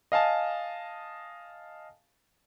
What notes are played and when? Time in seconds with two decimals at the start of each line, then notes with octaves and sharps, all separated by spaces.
0.12 D#5 F5 G#5 A5 D#6